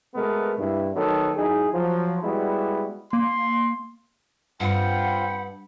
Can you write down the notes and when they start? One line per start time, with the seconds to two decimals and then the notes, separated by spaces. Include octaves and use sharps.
0.15 B2 G#3 A3 B3 A#4
0.59 G2 E4
0.95 D#3 F#3 A3 B3 A4
1.35 F#3 D#4 E4 G#4
1.72 F3 F#3
2.22 G3 G#3 B3 E4 F#4
3.13 A#3 C6
4.60 G2 C4 F4 F#5 G5 B5